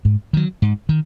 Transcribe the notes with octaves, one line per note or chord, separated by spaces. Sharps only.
G#2
D#3 F#3
G#2
D#3